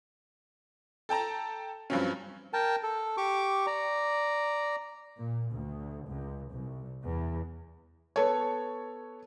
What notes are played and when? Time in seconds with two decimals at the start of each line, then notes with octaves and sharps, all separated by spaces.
1.09 A4 G5 A5 A#5
1.90 G2 F3 F#3 C4 C#4
2.53 A#4 G5 A5
2.83 A4
3.17 G4 C#6 D6
3.67 D5 A#5
5.17 A#2
5.52 D2
6.08 C#2
6.52 C2
7.02 E2
8.16 B3 A4 C#5